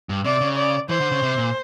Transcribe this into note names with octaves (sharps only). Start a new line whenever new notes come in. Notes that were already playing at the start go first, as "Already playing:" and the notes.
G2
C3 D5
C#3
D5
E3 C5
D3
C#3
C3
A#2